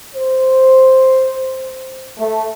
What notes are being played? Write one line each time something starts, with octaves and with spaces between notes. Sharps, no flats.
C5
A3